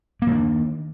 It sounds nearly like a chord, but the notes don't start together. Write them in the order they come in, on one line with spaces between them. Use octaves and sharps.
A#3 D#3 D4